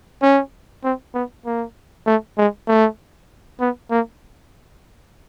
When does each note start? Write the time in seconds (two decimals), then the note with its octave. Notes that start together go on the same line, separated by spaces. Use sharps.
0.22 C#4
0.84 C4
1.14 B3
1.46 A#3
2.06 A3
2.38 G#3
2.68 A3
3.60 B3
3.91 A#3